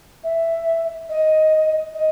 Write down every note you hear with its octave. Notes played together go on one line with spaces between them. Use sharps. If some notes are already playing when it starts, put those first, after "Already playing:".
E5
D#5
D#5